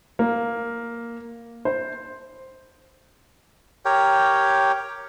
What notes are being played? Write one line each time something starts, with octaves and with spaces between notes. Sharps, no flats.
A#3
C5
G4 A#4 C#5 G5